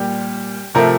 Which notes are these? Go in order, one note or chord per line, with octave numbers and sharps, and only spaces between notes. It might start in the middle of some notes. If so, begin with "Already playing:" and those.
Already playing: A#2 G3 G4
C3 F3 A3 A#4